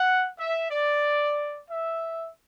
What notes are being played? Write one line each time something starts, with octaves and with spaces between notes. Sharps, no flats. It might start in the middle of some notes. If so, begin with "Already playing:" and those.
Already playing: F#5
E5
D5
E5